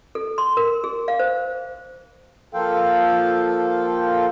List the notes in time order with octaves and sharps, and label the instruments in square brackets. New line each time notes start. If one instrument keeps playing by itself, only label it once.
[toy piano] A4
C6
A#4
G#4
F5
C5
[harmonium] F3 A#3 F4 A4 F5 G5